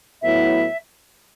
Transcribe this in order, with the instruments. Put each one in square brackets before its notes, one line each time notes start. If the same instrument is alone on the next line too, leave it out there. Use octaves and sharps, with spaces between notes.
[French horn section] A2 F#3 B3 E4 [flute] E5